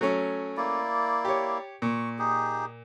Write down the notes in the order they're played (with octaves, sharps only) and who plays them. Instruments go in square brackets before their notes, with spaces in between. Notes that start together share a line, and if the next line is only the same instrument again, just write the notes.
[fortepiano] F#3 A3 C#4
[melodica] A#3 E4 D5
[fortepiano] G4 C#5
[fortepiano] A#2 [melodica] C#6
[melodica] D#4 G4 G#4